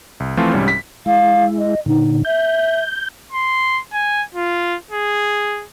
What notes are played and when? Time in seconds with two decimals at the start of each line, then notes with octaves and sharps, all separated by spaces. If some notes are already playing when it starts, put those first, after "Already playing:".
0.20 C2
0.37 E3 F3 A3 C4 F4
0.53 C2 G#2 G3 C#4
0.68 B6
1.06 G#3 E4 F5
1.58 D#5
1.86 A#2 D3 D#4
2.25 E5 G6
3.32 C6
3.94 G#5
4.35 F4
4.91 G#4